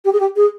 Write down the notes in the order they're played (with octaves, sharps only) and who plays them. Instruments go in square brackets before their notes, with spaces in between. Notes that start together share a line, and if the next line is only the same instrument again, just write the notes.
[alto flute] G4
G#4
G4
G#4